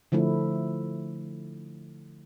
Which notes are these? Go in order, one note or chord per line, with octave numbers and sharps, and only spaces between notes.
D3 F3 A3 E4